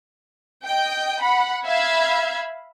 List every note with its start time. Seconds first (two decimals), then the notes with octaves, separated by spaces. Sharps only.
0.65 D#5 G5
1.21 F#5 B5
1.65 E5 F5 B5 G#6